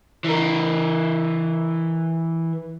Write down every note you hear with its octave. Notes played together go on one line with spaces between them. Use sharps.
E3 A#4